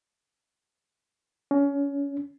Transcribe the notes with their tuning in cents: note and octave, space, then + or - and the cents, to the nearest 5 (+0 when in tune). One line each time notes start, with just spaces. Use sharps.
C#4 +25